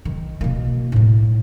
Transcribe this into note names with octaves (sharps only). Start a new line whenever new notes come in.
D#3
B2 A#3
A2 D#4